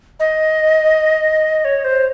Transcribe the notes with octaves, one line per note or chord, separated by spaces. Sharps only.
D#5
C#5
C5